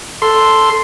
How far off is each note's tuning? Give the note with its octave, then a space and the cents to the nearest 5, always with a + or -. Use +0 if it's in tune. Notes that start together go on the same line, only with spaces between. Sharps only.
A4 +0 C6 +0